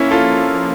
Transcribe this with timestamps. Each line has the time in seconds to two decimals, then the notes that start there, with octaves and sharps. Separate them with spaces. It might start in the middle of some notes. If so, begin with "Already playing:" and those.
Already playing: A#3 C#4 E4
0.11 F3 F4 A4